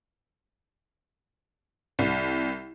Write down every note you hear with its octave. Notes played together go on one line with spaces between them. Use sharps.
C2